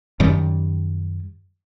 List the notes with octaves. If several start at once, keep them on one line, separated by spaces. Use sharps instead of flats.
F#2 D#3 G3